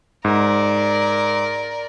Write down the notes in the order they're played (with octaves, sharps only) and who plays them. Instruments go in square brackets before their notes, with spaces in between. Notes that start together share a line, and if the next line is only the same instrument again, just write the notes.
[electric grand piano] G#2 [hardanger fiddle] A#4 D5